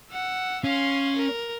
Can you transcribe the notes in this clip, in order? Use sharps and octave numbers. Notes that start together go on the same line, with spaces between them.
F#5 E6
C#4 F5 C6
A#4